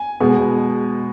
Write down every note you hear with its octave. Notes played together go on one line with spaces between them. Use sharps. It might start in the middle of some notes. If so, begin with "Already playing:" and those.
Already playing: G#5
B2 G#3 B3